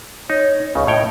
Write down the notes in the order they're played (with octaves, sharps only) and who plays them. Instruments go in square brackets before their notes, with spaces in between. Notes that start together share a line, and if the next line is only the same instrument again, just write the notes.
[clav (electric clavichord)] D#4 [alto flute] C#5
[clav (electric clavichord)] C#2 C#3 [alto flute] C#6
[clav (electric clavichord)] A2 C#5 G5 [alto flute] D#5